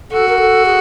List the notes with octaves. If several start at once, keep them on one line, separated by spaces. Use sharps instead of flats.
F#4 A4
A#4
A4
G#4